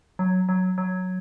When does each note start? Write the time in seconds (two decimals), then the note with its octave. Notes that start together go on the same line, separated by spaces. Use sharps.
0.19 F#3
0.49 F#3
0.78 F#3